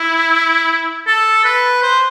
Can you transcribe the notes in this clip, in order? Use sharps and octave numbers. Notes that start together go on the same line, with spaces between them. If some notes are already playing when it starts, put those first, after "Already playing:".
Already playing: E4
A4
B4
C5